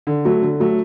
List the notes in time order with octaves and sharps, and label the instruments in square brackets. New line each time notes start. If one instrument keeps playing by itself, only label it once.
[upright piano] D3
F#3 A3
D3
F#3 A3